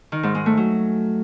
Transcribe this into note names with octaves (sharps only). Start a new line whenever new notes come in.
D#3
G#2
G#3
A3
F#3